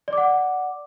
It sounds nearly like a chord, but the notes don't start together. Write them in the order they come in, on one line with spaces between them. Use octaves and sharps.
D5 D6 F#5